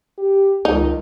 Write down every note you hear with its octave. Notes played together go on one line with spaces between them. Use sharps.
G4
C#2 D#3 D#4